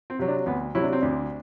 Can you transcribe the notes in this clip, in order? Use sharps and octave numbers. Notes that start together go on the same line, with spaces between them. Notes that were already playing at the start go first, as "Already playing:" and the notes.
C4
C3 F#3
D4
D2 B3
C3 F#3 E4
D4
C4
D2 D4